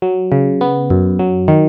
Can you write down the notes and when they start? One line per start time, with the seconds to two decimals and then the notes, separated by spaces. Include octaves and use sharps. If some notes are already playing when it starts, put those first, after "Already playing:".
0.02 F#3
0.32 C#3
0.61 B3
0.90 F#2
1.19 F#3
1.48 D#3